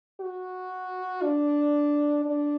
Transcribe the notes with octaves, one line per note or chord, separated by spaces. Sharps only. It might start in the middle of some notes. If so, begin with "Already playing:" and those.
F#4
D4
D4